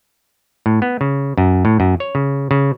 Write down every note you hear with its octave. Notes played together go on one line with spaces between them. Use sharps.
A2
B3
C#3
F#2
A2
F#2
C#5
C#3
C#3